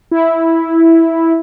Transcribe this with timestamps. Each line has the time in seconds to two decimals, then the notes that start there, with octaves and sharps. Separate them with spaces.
0.11 E4